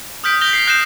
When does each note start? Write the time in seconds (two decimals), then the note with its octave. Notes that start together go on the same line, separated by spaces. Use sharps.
0.24 D#6 F6 G6 B6 D7
0.41 G6 A#6 F7 G7
0.53 C7
0.67 F#6 G6 A#6 C7 E7